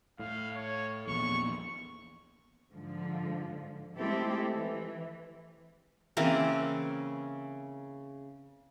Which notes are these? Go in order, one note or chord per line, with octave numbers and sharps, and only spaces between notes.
A2 F5
C#5
A#1 E2 C#6
G#2 D3 F3
G#3 A3 C4 E4 G4 A4
E3
C#3 E3 A#3 C4